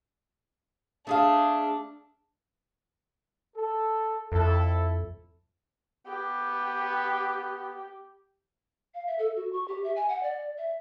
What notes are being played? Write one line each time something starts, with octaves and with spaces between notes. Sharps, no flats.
A3 D4 G#4 F5
A4
F2 E4 A4
B3 G4
F5
E5
A4
F#4
C#6
G4
E5
G#5
F#5
D5
E5